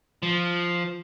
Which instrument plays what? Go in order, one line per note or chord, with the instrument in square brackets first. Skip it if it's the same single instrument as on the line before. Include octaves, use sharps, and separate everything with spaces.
[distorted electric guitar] F3